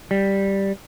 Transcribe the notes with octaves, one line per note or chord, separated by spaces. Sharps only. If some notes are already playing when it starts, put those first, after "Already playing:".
G3